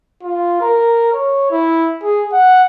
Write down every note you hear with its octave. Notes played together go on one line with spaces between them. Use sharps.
F4
A#4
C#5
E4
G#4
F#5